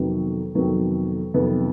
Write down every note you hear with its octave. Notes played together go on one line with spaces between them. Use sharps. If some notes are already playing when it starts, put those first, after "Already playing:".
Already playing: F2 C3 D#3 F#3 B3
F2 C3 D#3 F#3 B3
F2 C3 D#3 F#3 B3